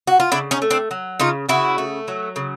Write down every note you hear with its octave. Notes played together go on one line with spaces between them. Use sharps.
F#4
F4
C#3 D4 E4
C#4 D#4
A3
C4 D4
F#3
C#3 D#4 F4
C#3 E4 F#4
A3
F#3
C#3